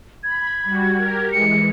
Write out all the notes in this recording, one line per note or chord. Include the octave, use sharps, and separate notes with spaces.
B5 G#6
G3 F#4
G4 A#4
E3 G#3 C#7